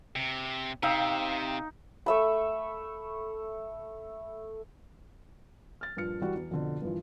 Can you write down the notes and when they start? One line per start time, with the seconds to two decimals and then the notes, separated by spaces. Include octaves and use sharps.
0.16 C3
0.83 C3 D#4 F5 G5 E6
2.06 A3 E5 B5
5.81 F6 A6
5.97 G2 A#2 F3 F6 C#7
6.21 E3 G3 F#4
6.35 E2
6.51 F2 B2 D3
6.82 G2 A#2 E3 F3